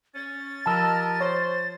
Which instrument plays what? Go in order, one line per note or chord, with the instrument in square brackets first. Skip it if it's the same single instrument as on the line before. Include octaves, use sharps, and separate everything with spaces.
[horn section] C#4 [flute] A6
[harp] F3 B5 [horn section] G4 A#4 D#5 [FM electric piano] A5 E6
[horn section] C5 [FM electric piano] C#5